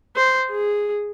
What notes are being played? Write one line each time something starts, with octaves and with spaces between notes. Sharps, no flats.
C5
G#4